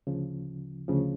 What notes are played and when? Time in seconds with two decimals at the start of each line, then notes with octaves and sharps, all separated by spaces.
0.07 D2 C#3 F3
0.88 D2 C#3 F3